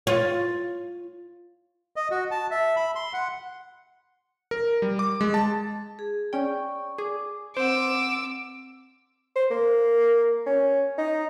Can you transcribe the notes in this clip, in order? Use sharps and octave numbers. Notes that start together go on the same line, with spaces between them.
F4 C#5
D#5
F#4
A5
E5
B5
C6
F#5
A#4
G3
D6
G#3
A5
G#4
C#4 D5 G5 C#6
G#4 D6
C4 C5 F#5 D6 E6
C5
A#3
C#4
D#4